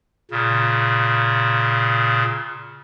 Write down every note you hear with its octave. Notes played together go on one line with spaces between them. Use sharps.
A#2 C#3